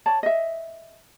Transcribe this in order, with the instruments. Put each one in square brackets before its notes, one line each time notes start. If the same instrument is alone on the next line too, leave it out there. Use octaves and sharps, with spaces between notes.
[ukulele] C#5 D5 A5
D#5 E5